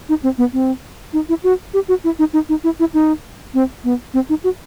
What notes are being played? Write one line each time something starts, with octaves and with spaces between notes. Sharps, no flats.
D#4
C4
B3
C4
D#4
E4
F#4
G4
F#4
E4
D#4
D#4
D#4
E4
E4
D#4
C4
B3
C4
D#4
F#4